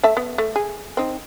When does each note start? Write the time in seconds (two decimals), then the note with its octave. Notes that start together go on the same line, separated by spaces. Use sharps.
0.03 A3 E5 A5
0.17 B3
0.38 A3
0.56 G#4
0.97 C4 D#4